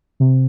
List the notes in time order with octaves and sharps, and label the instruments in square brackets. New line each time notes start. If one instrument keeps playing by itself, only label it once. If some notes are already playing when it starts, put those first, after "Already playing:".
[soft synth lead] C3